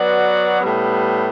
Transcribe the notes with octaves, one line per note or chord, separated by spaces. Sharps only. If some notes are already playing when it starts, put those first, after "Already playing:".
Already playing: F#3 B3 F#4 B4 D5
A2 G3 B3